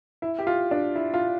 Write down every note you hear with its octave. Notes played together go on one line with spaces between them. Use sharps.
E4
G4
F4
D4
E4
F4